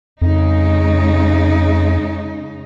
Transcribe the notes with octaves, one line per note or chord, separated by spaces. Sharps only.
F2 C#3 G#3 D#4